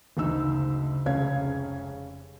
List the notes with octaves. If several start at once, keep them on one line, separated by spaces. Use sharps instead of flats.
F#1 D2 D#4 E6
F1 C#2 C#4 F5 G#6